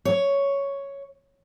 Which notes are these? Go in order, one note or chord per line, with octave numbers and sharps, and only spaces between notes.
C#5